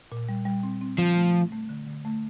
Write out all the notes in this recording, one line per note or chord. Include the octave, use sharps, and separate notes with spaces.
A#2
G3
G3
C4
C4
D3 F3
A3
A3
A3
D3
D3
A3